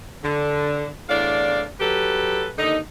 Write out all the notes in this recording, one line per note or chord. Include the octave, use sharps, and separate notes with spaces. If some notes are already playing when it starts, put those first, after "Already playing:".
D3
E2 A2 D4 D5 F5
F#3 G4 A4 B4
D#2 D3 D#4